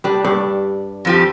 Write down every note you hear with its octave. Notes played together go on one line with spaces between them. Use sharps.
G3 D4
G2 D4
F2 F3 G4